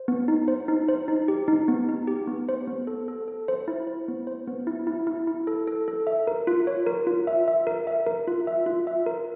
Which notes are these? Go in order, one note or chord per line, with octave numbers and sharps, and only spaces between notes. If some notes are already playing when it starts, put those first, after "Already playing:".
Already playing: C5
B3
D#4
C5
D#4
C5
D#4
G4
D#4
B3
D#4
G4
B3
C5
B3
A4
A4
A4
C5
E4
C5
B3
C5
B3
E4
E4
E4
E4
A4
A4
A4
E5
A#4
F4
C#5
A#4
F4
E5
E5
A#4
E5
A#4
F4
E5
F4
E5
A#4